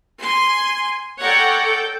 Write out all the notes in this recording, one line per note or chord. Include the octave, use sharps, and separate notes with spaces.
G#5 C6
A4 C#5 D5 F#5 G5 A#5
A4 G5